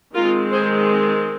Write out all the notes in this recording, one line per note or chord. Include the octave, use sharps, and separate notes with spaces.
D#3 G#3 C4 F4 A#4
G#4 C5